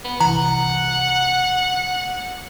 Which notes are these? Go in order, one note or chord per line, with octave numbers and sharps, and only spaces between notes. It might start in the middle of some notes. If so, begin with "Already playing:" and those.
B3
C2 E3 F#5 A#5